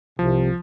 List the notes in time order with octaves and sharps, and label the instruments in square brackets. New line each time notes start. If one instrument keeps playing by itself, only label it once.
[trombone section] C2 C3 [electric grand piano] F3